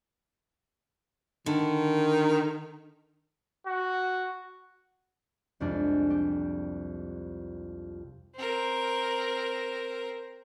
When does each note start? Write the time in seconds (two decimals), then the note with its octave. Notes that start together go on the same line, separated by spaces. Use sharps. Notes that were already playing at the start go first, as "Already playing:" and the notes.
1.46 D3 D#3
3.67 F#4
5.60 C2 F2 G#3 D4
6.10 G4
8.35 C4 A#4